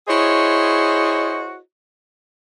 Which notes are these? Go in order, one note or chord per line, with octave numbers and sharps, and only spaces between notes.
E4 F#4 G#4 C5 C#5 D#5